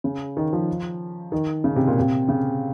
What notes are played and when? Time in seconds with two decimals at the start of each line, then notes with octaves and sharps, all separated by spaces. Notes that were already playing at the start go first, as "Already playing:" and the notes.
0.04 C#3
0.37 D#3
0.53 F3
1.32 D#3
1.64 C#3
1.76 C3
1.88 A#2
2.00 C3
2.29 C#3